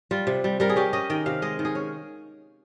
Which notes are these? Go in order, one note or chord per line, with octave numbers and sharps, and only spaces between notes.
G3 F4
C3
G3
G3 A#4
G#4
C#4 G4
C#4 D#5
D#3 G5
C3 F5
G#3 D#5
D#3
G#4
C#4